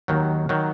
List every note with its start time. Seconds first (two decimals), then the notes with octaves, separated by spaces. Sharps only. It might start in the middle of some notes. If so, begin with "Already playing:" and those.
0.08 D#2 D#3 F#3
0.49 D#3 F#3